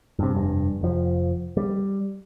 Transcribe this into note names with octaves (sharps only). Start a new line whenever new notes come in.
G2 C3
F1 G2
F1 F3
G3